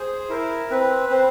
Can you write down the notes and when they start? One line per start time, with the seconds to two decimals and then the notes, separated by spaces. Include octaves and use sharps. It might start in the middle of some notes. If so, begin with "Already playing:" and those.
Already playing: G#4 C5
0.29 E4 A#4
0.71 C4 B4
1.09 C4 C5